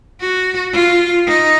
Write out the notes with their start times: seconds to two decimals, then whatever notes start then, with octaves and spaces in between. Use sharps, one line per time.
0.21 F#4
0.74 F4
1.27 D#4